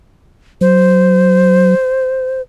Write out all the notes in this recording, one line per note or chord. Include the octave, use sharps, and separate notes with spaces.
F#3 C5